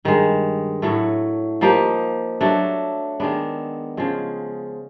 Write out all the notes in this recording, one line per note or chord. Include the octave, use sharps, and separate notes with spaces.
G2 D#3 G#3
A2 F#3 A3
F3 A#3 D#4 G4
F#3 A3 D4
D#3 G#3 B3 D4
C#3 F3 G#3